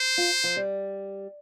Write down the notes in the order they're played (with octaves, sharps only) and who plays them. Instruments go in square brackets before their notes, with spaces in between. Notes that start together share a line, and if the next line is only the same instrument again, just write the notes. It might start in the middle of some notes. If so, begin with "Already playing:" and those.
Already playing: [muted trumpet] C5
[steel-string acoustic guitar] F4
F3
G3